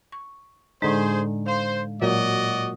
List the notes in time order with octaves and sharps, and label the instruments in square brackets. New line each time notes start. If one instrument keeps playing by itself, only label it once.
[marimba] C#6
[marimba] A2 G#3 [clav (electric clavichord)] D3 D#4 [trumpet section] G#4 C5
[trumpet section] C5 [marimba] F5
[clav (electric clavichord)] A#2 F#3 [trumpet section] F#4 D5 D#5